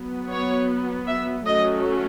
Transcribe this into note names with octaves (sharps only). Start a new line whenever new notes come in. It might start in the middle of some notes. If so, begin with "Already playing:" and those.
Already playing: F#3 B3
C#5
E5
F#3 A3 C#4 D#5